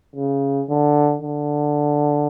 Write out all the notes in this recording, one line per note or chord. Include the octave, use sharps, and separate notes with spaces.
C#3
D3
D3